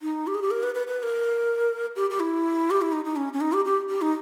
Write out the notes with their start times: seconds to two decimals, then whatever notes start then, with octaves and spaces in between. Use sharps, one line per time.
0.02 D#4
0.27 G4
0.34 G#4
0.42 G4
0.51 A#4
0.63 B4
0.75 B4
0.87 B4
0.99 B4
1.03 A#4
1.96 G4
2.10 G4
2.20 E4
2.71 G4
2.81 E4
2.92 D#4
3.05 D#4
3.16 C#4
3.33 C#4
3.41 D#4
3.53 G4
3.65 G4
3.89 G4
4.02 D#4